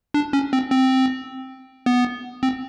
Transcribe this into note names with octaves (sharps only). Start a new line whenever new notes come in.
D4
C#4
C4
C4
B3
C4